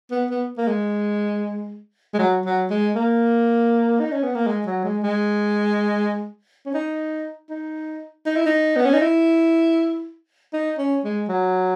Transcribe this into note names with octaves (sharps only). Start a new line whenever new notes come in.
B3
B3
A#3
G#3
G#3
F#3
F#3
G#3
A#3
D#4
C#4
B3
A#3
G#3
F#3
G#3
G#3
C#4
D#4
D#4
D#4
E4
D#4
B3
C#4
D#4
E4
D#4
C#4
G#3
F#3